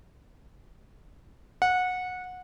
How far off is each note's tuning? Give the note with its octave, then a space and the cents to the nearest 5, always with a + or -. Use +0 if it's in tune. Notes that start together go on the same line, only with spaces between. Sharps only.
F#5 -20